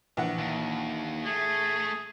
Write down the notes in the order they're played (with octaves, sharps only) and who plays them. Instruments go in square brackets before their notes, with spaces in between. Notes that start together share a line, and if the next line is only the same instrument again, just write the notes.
[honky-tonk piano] A#1 E3 F#5
[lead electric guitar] D#2
[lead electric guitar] A3 [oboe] G#4